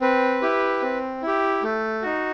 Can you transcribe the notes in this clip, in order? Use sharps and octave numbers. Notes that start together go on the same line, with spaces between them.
C4 B4
E4 G4
C4
E4 G4
A3
D#4 F#4